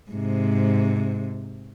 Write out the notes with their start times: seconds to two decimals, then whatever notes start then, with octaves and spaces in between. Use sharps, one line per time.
0.11 G#2 C3